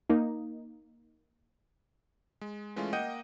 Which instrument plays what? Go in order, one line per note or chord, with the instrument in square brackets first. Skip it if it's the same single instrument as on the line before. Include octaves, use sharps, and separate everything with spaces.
[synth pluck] A#3 D#4
[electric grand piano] G#3
E3 G#3 A3 C#4 F4
A#3 D#5 F#5 G5 G6 D#7